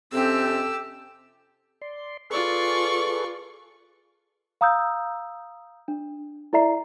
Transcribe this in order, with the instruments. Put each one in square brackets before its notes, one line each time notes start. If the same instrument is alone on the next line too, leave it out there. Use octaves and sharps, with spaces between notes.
[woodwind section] F2 C3 C#4 [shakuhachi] C4 [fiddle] G4 E6 [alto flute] A4
[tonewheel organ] D5 C6
[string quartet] F4 D5 C#6 [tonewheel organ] G#4 A4 B4
[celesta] F5 A#5 D#6 E6 G6
D4
E4 A4 D5 E5 A#5 C7